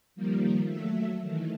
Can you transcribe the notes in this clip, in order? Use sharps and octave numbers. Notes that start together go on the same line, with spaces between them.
D#3 F3 G3 A#3
F#3 A3 E5
D#3 E3 A3